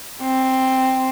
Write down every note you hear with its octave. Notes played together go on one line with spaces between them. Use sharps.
C4